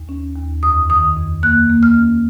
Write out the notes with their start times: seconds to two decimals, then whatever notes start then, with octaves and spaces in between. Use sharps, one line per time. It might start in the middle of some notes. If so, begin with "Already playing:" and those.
Already playing: D#2
0.09 C#4
0.35 D#2
0.63 F2 D#6
0.89 D#3 D#6
1.17 F2
1.43 A#3 F#6
1.70 A#3
1.83 F6
1.97 C#4